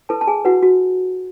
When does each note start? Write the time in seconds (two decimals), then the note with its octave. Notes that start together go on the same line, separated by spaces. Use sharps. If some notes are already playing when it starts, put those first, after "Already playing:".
0.09 E4 A4 B4 A5
0.21 A5
0.27 G#4 G#5
0.45 E4 F#4 B4 F#5
0.62 F#4